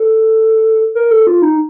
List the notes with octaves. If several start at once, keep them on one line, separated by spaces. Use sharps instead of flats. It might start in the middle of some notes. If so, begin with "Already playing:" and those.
Already playing: A4
A#4
A4
F4
D#4